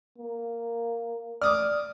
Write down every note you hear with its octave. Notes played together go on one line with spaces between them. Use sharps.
A#3
D5 D6 D#6 F6